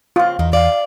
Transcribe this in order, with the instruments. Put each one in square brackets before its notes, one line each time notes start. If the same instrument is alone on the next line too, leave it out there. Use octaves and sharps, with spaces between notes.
[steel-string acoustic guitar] C#3 C4 [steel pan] F4
[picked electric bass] E2 [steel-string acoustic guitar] D#3 D#4
[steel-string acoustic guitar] D5 [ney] F5